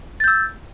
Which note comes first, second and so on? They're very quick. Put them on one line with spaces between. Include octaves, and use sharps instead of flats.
A6 G6 E6